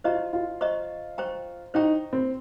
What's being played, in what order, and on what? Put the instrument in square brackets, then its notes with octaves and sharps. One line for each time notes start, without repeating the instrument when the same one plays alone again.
[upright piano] F4 [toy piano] C5 D#5 A#5 C#6
[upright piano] F4
[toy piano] C5 D#5 A#5 C#6
C5 G5 A#5 C#6
[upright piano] D#4 [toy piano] C5 G5 A#5 C#6
[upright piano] C4